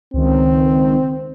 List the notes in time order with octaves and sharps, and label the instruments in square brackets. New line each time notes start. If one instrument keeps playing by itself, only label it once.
[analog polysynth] C#2 D#3 [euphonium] C4